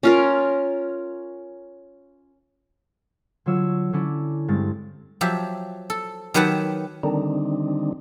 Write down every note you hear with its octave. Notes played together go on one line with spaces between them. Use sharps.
C#4 F4 A#4
D3 F#3 F4 C#5 E6
D3 C#4 E4 D5
G2 G#3 C4 A6
F3 F#3 G4 E5
A4
D#3 F#3 G4 B4 F#5 A5
D3 D#3 G3 C4 D4 D#4